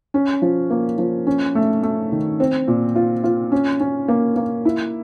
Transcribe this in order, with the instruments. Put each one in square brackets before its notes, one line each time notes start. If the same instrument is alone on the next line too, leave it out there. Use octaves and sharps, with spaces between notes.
[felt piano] C#4
F3
A#3
F3
C#4
A3
A3
D#3
C4
A#2
F4
F4
C#4
C#4
A#3
A#3
E4